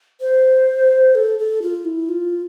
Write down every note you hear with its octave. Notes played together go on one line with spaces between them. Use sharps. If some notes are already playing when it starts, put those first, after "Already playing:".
C5
A4
A4
F4
E4
F4